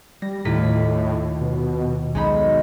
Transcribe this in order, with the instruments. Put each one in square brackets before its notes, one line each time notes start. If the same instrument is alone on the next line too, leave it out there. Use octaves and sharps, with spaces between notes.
[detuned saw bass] G3 [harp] A#6
[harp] D#2 F4 B6 [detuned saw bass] A2
[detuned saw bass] B2
[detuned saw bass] B1 [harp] G#3 D#4 B5